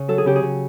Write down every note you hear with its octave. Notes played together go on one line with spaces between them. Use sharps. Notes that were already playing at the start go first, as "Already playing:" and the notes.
Already playing: C#3
F#3 A4
G#4
C#3 G4
G#4
C#3